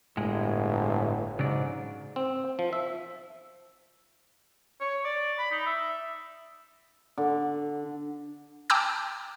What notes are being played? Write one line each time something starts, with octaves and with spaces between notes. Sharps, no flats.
G1 A2 G#3
G#2 C#3 F#3 D5
C4
F3
E5
C#5
D5
B5
D#4
E5
D3
G5 A5 A#5 D6 E6 G6